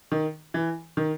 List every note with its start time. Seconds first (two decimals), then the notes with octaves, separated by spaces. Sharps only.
0.12 D#3
0.54 E3
0.97 D#3